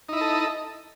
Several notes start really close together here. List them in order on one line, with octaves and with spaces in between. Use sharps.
D#4 E4 D#5 A4